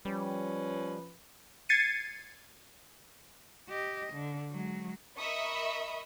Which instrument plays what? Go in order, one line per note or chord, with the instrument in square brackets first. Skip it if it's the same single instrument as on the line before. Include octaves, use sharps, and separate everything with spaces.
[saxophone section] F3 C#4 B4 [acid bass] G3
[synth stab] G#6 A6 C7 C#7 D#7
[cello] G4 D#5
D3
F#3 G#3
[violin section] A#4 D#5 E5 B5 C#6 D#6